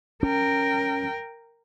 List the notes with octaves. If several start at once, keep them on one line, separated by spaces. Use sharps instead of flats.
C#4 A#4 G5